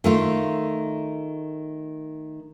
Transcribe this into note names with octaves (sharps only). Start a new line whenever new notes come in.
D#3 A3 F4